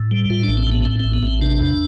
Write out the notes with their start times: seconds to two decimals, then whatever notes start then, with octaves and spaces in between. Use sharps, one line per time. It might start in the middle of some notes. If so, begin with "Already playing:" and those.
Already playing: A2
0.11 G3
0.30 A2 F4
0.44 A1 D4
0.57 C4
0.67 A2 B3
0.85 A2 C4
1.00 A1 C4
1.14 B3
1.23 A1 C4
1.41 C3 D4
1.60 E2